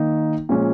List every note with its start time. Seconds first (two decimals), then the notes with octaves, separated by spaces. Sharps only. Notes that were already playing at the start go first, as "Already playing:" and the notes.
Already playing: D#3 A#3 D#4
0.49 A#2 F3 G#3 C#4